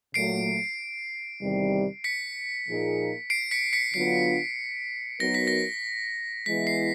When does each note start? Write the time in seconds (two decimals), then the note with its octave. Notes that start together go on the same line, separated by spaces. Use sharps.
0.14 A#2 F#3 A3 C7 D7
1.41 E2 C3 D#3 G3
2.04 B6 C#7
2.67 A#2 F3 A#3 D#4 G#4
3.30 C7 D7
3.51 B6 C#7
3.73 B6 C#7
3.94 D3 F#3 B3 D4 F4 C7
5.20 F#3 B3 D#4 F#4 A#4 A#6
5.34 B6
5.47 A#6
6.46 E3 G#3 B3 E4 B6
6.67 C7